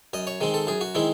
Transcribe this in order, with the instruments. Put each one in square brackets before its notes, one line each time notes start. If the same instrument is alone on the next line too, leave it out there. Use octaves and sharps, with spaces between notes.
[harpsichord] F#2 D#5
C#5
D#3 G#3 C4
A4
F#2 G#4
F#4
D#3 G#3 C4 E4